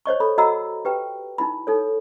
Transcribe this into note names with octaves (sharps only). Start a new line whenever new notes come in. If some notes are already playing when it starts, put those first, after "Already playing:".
C5 C#5 D#5 C#6
A4 B5
F#4 D#5 F#5 A#5 B5 E6
G4 B4 G5
D#4 E4 B5
D#4 A4 C#5